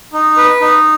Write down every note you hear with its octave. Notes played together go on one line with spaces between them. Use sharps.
D#4
B4
D#4